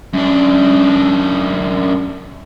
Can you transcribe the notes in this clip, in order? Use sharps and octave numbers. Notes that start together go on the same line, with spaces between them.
F#2 D4